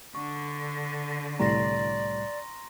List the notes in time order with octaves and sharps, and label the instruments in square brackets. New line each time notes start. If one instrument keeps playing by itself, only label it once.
[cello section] D3 [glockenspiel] C#6
[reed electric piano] C2 A2 G3 [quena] D5 [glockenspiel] A#5 C6 A#6